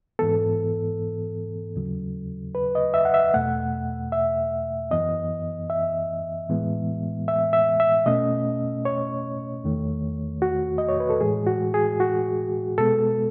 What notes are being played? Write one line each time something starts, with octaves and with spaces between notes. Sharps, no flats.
G#2 E3 B3 A4
D#2 C#3 F#3
B4
D#5
E5
F#5
E5
E2 B2 A3 F#5
E5
F#2 E3 B3 D#5
E5
A2 E3 G#3 B3
E5
E5
E5
B2 A3 C#4 D#5
C#5
E2 D#3 A3
F#4
D#5
C#5
B4
A4
A2 E3 G#3 G#4
F#4
G#4
F#4
B2 G#3 B3 A4